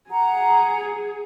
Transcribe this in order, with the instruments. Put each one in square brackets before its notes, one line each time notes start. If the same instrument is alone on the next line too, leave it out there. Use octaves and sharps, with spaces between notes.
[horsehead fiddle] G#4 [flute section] F#5 A#5